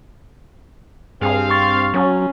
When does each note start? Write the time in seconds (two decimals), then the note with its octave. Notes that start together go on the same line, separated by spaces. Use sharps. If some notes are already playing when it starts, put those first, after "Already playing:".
1.21 G2 C4 G#4 F5
1.50 C6 C#6 A6
1.94 F#3 C#4